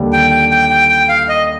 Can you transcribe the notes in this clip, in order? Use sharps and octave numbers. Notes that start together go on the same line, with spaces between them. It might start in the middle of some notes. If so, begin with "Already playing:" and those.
Already playing: D#2 D3 G3 D4
G5
G5
G5
G5
G5
F5
D#5